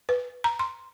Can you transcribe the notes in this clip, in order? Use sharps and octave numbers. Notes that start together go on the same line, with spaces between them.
B4
A#5
C6